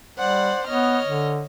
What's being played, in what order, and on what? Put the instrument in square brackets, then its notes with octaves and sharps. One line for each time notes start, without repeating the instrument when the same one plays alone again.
[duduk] G3 [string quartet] C5 D5 F#5
[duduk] B3 [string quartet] C#5 D#5 F6
[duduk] D3